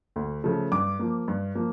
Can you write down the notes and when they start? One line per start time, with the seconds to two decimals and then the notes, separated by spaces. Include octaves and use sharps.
0.16 D2
0.44 C#3 F3 A3
0.72 G2 D6
0.99 F3 A#3
1.28 G2
1.55 F3 A#3